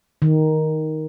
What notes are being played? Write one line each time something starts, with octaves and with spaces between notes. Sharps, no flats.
D#3